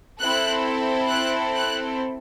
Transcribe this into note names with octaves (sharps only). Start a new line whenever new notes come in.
C4 E4 A4 F#6
F#6
F#6